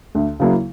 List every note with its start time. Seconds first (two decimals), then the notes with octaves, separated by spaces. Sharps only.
0.15 D2
0.40 C#3 F#3 A#3 E4